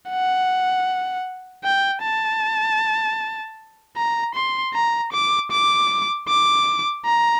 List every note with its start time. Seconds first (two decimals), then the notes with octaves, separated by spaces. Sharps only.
0.09 F#5
1.64 G5
2.03 A5
3.96 A#5
4.34 C6
4.74 A#5
5.12 D6
5.51 D6
6.28 D6
7.05 A#5